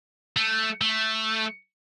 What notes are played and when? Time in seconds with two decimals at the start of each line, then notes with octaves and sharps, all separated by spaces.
0.37 A3
0.81 A3